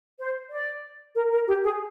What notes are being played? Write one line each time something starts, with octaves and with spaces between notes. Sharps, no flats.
C5
D5
A#4
A#4
G4
G#4